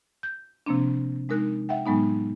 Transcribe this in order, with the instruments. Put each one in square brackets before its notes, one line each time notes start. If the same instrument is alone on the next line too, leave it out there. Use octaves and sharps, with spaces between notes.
[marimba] G6
C3 F3 A#3 C4 D4
G#3 D#4 A#4 F#6
E5 F#5 G5
A2 F#3 G#3 B3 D#4